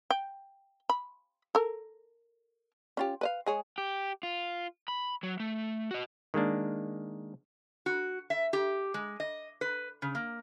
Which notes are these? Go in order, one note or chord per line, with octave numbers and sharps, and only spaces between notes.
G5
B5
A4 A#4
C#4 F4 G4
B4 D#5 F5
G#3 G#4 C#5
G4
F4
B5
F#3
A3
F#4 D#5
D#3 G#3 A#3 D4
F#4
E5
G4
G#3
D#5
B4
C#3
A#3